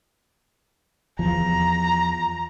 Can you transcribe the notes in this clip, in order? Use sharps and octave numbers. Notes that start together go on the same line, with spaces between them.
E2 F3 A#5